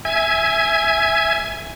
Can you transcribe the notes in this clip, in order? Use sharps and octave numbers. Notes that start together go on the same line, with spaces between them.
E5 G#5 G#6